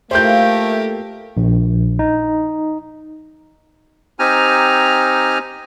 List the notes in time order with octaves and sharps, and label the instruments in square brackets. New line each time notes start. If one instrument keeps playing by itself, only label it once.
[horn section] A3 [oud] A#3 E4 F4 [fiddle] G4 A#4 [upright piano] C5 G6
[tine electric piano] A#1
D#4
[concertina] C4 D#4 G4 G#5 A#5 F6